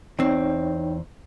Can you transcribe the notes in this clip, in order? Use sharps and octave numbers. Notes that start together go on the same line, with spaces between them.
E2 C4 D#4 C#5 G5